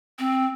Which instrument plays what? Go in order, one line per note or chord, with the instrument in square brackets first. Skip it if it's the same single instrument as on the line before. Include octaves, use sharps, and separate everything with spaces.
[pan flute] C4